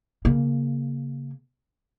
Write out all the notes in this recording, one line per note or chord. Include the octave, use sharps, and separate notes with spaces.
C#3 A#3